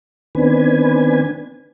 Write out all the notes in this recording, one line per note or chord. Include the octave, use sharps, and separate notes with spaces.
D#3 B3 C4 D4 B4 G#5